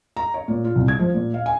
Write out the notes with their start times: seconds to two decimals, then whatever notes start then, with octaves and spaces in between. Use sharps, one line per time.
0.17 A#5
0.34 C#5
0.48 A#2
0.64 F4
0.76 C2
0.88 G#6
0.99 F3
1.14 A#2
1.34 F5
1.46 G#5